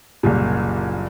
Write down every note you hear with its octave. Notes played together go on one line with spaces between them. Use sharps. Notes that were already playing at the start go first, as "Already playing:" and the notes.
F#1 C2 A#2